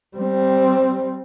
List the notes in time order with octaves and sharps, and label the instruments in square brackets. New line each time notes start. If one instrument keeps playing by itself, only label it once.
[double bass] G3 C4